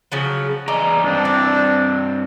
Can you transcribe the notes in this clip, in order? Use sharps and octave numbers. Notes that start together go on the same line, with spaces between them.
C#3 F3 F#3
E2 C#4 D5 D#5 A#5
G2 C4 D4
D5